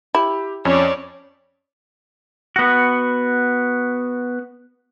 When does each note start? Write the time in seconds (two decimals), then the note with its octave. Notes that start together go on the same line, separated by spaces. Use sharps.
0.15 E4 G4
0.65 F2 C#4 C#5 D5
2.56 B3 F#4